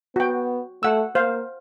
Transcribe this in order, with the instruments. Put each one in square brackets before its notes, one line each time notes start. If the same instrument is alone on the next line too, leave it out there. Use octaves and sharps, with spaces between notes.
[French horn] B3 [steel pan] F#4 G5
[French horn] A3 [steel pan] F#5 E6
[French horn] A#3 [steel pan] C5 F5